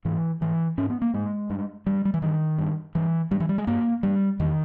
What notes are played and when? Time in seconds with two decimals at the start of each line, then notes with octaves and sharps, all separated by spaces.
0.05 G#2 E3
0.41 G#2 E3
0.78 G#2 C#4
0.90 B3
1.02 A#3
1.14 G#2 G#3
1.50 G2
1.86 G2 G3
2.05 G3
2.14 E3
2.22 G2 D#3
2.58 G2
2.95 G2 E3
3.31 G2 G3
3.40 E3
3.49 G3
3.58 G#3
3.67 G2 A#3
4.03 G2 G3
4.39 E2 D#3